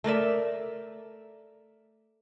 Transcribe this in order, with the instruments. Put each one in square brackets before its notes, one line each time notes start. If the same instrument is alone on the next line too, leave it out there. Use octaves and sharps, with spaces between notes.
[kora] A3 A#4 D5 E5